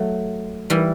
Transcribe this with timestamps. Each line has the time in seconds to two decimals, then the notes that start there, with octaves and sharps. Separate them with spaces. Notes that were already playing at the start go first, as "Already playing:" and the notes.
Already playing: F#3 A3
0.70 E3 G3